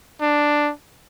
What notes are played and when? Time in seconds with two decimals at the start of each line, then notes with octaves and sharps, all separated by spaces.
0.21 D4